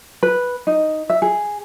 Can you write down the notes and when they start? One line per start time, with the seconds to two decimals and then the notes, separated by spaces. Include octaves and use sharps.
0.23 B4
0.67 D#4
1.10 E5
1.22 G#4